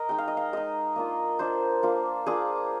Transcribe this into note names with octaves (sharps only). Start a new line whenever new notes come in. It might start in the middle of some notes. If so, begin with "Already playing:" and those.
Already playing: A#4 D#5
G#3 D#4 G5
F5
D#5
F5
G#3 D#4 D#5
A#3 D4 F4
A#3 D4 F4 C5
A#3 D4 F4
A#3 D4 F4 G#4